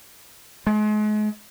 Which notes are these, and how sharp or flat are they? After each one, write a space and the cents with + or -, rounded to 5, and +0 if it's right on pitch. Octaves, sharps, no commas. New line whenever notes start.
G#3 +35